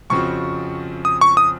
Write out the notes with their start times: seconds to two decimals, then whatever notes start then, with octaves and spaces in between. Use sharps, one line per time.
0.10 F2 C#3 F3 C4 F#4 C#6
1.05 D#6
1.21 C#6
1.37 D#6